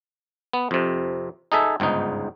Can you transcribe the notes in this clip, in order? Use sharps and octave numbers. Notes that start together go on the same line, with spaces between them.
B3
F2 C3
D#4 G#4 A4 E5
G1 C#2 G#2 D#4